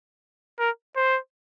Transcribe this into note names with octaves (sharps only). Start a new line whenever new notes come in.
A#4
C5